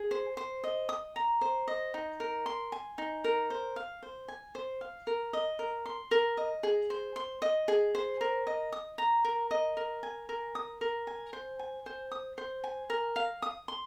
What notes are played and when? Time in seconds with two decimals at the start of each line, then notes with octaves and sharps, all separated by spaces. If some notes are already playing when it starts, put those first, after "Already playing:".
Already playing: G#4
0.11 C5
0.37 C5
0.64 D#5
0.89 D#6
1.16 A#5
1.41 C5
1.68 D#5
1.94 D#4
2.20 A#4
2.46 C6
2.72 G#5
2.98 D#4
3.24 A#4
3.50 C5
3.76 F5
4.03 C5
4.28 G#5
4.55 C5
4.81 F5
5.07 A#4
5.33 D#5
5.59 A#4
5.86 C6
6.11 A#4
6.37 D#5
6.63 G#4
6.90 C5
7.16 C6
7.42 D#5
7.68 G#4
7.95 C5
8.21 A#4
8.47 D#5
8.72 D#6
8.98 A#5
9.25 A#4
9.51 D#5
9.77 A#4
10.03 G#5
10.29 A#4
10.55 D#6
10.81 A#4
11.07 G#5
11.33 C5
11.59 G#5
11.86 C5
12.12 D#6
12.38 C5
12.64 G#5
12.90 A#4
13.16 F5
13.42 D#6
13.68 C6